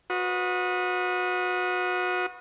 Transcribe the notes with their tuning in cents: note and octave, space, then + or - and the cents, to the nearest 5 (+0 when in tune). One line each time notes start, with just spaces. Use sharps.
F#4 -30 B4 +0 D#6 +0